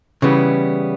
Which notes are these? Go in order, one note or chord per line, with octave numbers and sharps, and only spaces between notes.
C#3 E3 G3 B3